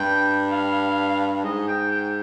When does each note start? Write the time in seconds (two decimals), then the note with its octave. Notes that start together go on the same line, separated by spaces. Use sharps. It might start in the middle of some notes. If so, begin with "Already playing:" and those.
Already playing: G2 G5
0.52 F5
1.44 G#2 D#5
1.68 G5
1.91 G5